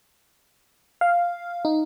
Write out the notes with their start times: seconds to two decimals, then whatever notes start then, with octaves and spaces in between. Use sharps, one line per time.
1.01 F5
1.65 D#4